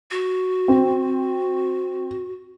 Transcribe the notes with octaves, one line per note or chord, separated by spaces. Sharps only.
F#4
C4